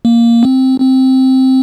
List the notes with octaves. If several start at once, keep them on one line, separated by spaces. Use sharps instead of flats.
A#3
C4
C4